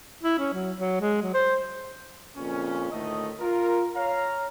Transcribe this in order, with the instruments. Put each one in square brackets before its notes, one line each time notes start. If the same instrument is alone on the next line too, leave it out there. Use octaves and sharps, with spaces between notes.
[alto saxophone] E4
C#4
F#3
F#3
G#3
F#3
C5
[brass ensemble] F2 A#2 C#3 C#4
D2 A2 D#3 A3 D#5
F4 A#4
C#5 F5 A#5